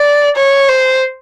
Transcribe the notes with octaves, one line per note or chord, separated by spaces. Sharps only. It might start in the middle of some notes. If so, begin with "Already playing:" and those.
Already playing: D5
C#5
C5